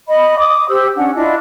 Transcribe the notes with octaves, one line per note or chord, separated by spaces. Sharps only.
D#5 B5
D6 D#6
G4 C5 E6
C#4 D4 F#5
D4 E4 F4 D#5